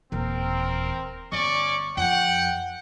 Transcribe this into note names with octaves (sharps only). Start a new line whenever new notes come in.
D#1 E3 C4 A#4
G1 C#4 D5 C#6
F2 F#5 G5